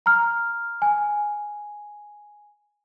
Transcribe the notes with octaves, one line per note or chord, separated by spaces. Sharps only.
A#5 F6
G#5